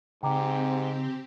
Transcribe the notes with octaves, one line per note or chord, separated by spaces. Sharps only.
G#2 C#3 C4 G4 G5 A#5 D6